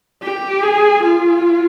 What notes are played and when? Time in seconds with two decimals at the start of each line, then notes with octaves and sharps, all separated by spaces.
0.23 G4
0.63 G#4
1.03 F4